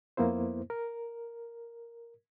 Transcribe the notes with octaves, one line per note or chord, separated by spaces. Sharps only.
F2 A#3 B3 E4 C5
A#4